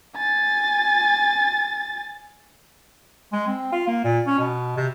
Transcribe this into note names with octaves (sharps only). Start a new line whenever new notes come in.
G#5 A6
G#3
C4
F4
A#3
A#2
C#4
B2
C3